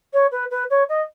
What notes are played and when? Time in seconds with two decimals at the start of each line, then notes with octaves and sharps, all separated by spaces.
0.13 C#5
0.31 B4
0.50 B4
0.70 C#5
0.89 D#5